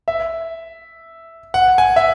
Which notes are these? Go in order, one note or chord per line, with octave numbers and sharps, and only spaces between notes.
E5
F#5
G#5
E5